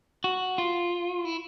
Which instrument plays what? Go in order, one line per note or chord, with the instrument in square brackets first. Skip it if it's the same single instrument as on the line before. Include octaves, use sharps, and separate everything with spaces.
[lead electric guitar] F#4
F4
E4